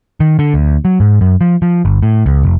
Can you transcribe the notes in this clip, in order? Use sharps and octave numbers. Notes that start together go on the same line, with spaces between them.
D#3
D3
D2
F#3
G#2
F#2
F3
F3
G1
A2
C#2
F1